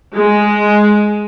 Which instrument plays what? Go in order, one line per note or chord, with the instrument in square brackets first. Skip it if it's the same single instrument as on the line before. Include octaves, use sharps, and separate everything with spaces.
[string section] G#3